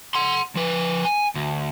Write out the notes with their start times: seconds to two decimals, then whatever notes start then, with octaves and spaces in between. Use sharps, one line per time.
0.15 F#5 C6
0.55 F3 B4
1.05 G#5
1.35 D2